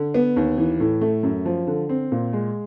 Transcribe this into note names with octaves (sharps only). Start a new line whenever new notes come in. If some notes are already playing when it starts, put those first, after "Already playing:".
Already playing: D3
B3
D#2
E3
A2
A3
F#2
F3
D3
C4
A#2
G#3